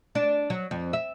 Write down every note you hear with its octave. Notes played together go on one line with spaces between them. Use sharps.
D4
F#3
F2
E5